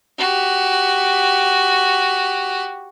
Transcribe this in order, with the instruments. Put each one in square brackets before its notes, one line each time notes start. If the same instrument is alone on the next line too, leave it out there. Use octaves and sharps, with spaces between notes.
[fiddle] F#4 G4